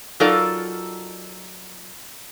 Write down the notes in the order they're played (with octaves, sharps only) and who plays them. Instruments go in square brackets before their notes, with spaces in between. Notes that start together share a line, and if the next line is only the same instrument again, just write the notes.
[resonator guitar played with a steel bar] F#3 D#4 F4 A4 A#4 D5